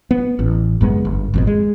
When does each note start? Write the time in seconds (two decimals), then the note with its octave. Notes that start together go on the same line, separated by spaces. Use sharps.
0.11 B3
0.39 A1
0.81 F#1 F#2 G#3 B3
1.05 G1
1.34 G#1 F2 B2
1.47 G#3